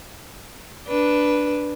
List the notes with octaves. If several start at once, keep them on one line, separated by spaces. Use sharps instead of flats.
D4 B4